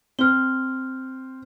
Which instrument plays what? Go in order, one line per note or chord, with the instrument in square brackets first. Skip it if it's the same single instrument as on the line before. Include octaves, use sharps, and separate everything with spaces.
[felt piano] C4 [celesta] F6 G7